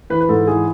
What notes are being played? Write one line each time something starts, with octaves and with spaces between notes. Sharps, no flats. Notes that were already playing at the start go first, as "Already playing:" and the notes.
E3 B4
B4
G#2 A4
E3 G#4